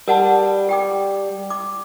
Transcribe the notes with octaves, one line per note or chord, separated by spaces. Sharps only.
G3 A#4 F#5 A5
G4 G5 D6
D6